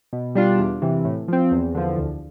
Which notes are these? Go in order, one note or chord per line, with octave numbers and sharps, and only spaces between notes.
B2
G3 D4 F4
E2
C3 E3
A2
F3 C4
E2
D3 F3
D2